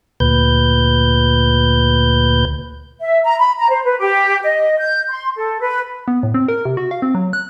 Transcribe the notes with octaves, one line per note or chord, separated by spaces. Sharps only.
D2 A#2 B4 G6
E5
A#5
B5
A#5
C5
B4
G4
D#5
G6
C6
A4
B4
B3
A2
C4
A#4
C3
F#4
F5
C4
F#3
F#6